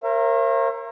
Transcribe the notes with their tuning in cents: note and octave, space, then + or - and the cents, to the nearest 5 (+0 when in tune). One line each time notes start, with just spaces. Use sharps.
A#4 +0 C#5 -45 E5 +40